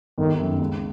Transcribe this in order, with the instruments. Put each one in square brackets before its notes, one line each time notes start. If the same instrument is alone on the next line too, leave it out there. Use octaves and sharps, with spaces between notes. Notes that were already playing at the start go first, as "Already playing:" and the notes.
[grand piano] G1 [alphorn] D#3
[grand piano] F#2 D#3
C#2